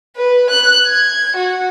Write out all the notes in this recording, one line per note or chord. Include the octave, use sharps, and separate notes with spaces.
B4
F#6
G#6
F#4